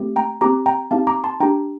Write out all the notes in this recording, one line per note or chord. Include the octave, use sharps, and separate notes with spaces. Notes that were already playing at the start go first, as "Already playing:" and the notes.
Already playing: A3 C4 G4
G5 A#5
C4 G4 A#5 D6
G5 A#5
C4 D#4 G4 F5 A5
A#5 D6
A5 C6
D4 G4 G5 A#5